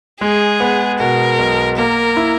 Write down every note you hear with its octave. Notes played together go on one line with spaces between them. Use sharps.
G#3 G#4
B3
B2 A#4
B1
A#3 A#4
E4